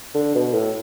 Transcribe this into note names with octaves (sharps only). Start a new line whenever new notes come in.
D3
B2
A2